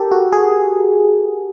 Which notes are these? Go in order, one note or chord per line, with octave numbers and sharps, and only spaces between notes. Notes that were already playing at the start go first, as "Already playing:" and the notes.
Already playing: G4 A4 A#4
F#4
G#4